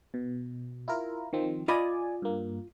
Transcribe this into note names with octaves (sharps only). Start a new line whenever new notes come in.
B2
E4 F4 A#4
D#3 F3 C4
F4 D5 D#5 G#5 B5
G2 A#3